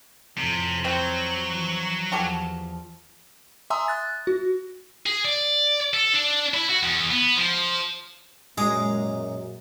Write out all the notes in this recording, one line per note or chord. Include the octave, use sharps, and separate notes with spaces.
F2 A2 C3
F#3 C4
E3 F3
E2 F3 F#4 G4 A4
E5 G#5 A#5 C6 D#6 E6
F#6 A6
F#4
G#4
D5
A4
D4
E4
F#4
E2
B3
F3
F#2 A#2 G#3 A#5 D6 D#6